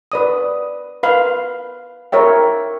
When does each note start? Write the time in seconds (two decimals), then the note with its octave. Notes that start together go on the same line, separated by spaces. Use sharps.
0.12 B4 D5 D#6
1.03 B4 F5
2.12 A#4 C#5 E5 G5